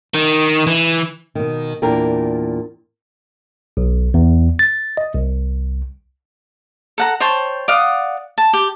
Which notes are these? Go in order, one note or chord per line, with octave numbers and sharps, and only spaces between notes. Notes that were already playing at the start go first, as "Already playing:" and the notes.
D#3
E3
B2 D#3
E2 A#2 D4 A#4 G5
B1
E2
A6
D#5
C2
A4 F#5 A#5
C5 C#5 G5 A5
D5 F5 F#5 D#6
A5
G4